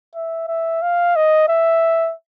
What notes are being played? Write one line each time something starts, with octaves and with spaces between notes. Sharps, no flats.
E5
E5
F5
D#5
E5